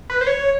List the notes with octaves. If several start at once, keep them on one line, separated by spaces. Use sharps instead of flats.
B4
C5
C#5